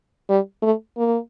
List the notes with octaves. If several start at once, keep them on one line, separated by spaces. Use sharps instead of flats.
G3
A3
A#3